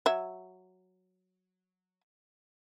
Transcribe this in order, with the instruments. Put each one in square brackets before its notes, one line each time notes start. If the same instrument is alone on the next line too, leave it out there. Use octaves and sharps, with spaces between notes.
[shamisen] F#3 E5